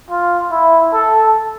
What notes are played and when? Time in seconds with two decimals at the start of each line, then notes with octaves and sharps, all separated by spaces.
0.10 F4
0.51 E4
0.93 A4